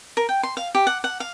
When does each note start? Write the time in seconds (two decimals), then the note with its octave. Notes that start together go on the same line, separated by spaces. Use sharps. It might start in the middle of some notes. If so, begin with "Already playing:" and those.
0.17 A#4
0.29 G5
0.43 C6
0.57 F5
0.75 G4
0.87 F#5
1.04 F#5
1.20 F5